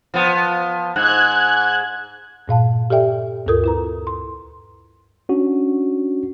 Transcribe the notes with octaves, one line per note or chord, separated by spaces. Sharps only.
F3 B3
G#2 F#6 G#6
G2 A#2 F5 A5
G4 A4 D5 E5 G5
D2 G2 F4 A4 A#4 D#6
E4 B4 A#5
C6
C#4 D4 F#4